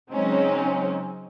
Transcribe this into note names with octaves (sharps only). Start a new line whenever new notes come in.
C#3 F#3 G#3 C4 C#4 D#4